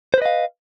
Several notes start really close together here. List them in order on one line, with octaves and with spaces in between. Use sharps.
C5 B4 D#5 F5